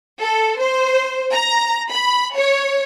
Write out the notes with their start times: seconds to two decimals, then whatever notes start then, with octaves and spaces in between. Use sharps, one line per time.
0.21 A4
0.60 C5
1.33 A#5
1.92 B5
2.36 C#5